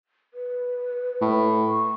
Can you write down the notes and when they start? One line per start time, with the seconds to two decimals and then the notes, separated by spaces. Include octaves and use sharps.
0.34 B4
1.21 A2
1.68 C#6